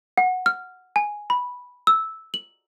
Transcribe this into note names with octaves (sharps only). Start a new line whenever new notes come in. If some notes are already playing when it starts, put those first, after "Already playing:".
F#5
F6
G#5
B5
E6
F#7